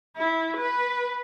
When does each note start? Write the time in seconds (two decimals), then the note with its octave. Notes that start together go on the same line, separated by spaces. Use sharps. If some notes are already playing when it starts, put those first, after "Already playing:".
0.17 E4
0.57 B4